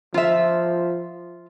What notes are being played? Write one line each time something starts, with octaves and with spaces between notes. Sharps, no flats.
F3 F4 E5